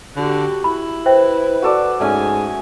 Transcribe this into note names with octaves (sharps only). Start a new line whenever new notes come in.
D3 F#4 G4
E4 B5
B4 C5 E5 G5
F#4 A4 D5
G#2 A3 C#4 D#5 G#5